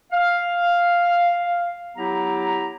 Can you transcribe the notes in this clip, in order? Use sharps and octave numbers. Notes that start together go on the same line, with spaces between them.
F5
F#3 B3 E4 G4 A#5